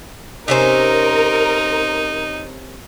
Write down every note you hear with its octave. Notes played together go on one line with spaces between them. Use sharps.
C3 C#4 D#4 A#4 C5